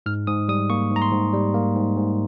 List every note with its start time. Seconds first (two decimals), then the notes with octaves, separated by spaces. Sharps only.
0.06 G#2 F6
0.27 G#2 D#6
0.49 G3 D#6
0.70 A#3 C#6
0.91 G#2 A#5
1.02 C6
1.12 G#2
1.33 G3
1.54 A#3
1.76 G#2
1.96 G#2